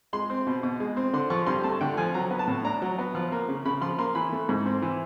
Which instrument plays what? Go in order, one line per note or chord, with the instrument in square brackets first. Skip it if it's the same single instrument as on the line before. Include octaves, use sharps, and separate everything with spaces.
[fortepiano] G#3 C6
C4
B2
B2
G#3
C4
D3 C6
F3 C#6
G2 C6
A3 A5
D3 G5
F3 G#5
F#3 A#5
B3
A5
A2
D4 A#5
F#3
B3
F3
A#3
C#3
C#3 B5
F3 C6
A#3 C6
E3 B5
A3
G#2
C4
E3